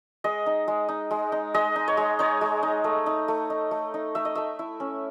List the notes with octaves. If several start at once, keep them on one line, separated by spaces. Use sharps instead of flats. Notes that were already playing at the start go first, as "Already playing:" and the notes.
G#3 D#5
D#4
G#3
D#4
G#3
D#4
G#3 D#5
D#4
C#5
G#3
D#4 C#5
G#3
D#4
A3
D#4
A3
D#4
A3
D#4
A3 E5
D#5
A3 E5
E4
C#4